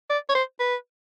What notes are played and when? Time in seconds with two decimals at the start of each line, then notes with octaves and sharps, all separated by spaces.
0.10 D5
0.29 C#5
0.35 C5
0.60 B4